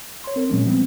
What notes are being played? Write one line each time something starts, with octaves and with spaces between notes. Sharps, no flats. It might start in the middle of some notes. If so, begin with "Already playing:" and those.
C#5 C6
C4 A#4
A#2 F#3 G#3 C#4
F3 G3 B3 C4